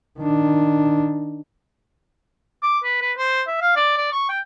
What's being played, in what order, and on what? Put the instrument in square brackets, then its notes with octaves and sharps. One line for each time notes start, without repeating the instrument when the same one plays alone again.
[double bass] D#3 D4
[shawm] D6
B4
B4
C5
E5
F5
D5
D5
C#6
G5